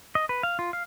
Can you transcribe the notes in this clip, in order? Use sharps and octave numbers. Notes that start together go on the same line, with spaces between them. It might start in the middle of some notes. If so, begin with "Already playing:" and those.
D#5
B4
F5
F4
F5